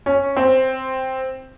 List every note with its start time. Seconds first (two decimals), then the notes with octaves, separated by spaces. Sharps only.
0.06 C#4
0.37 C4